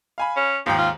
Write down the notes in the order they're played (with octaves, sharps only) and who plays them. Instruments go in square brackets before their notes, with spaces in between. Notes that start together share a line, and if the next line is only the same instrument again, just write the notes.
[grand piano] F5 G#5 B5
[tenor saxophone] C#4
[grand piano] D#2 G#2 G5 [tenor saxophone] F3
[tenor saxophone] F4